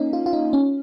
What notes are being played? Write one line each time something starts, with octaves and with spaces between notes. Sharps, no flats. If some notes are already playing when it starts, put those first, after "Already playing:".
Already playing: A#3 C#4 D#4
F4
F4
D#4
C#4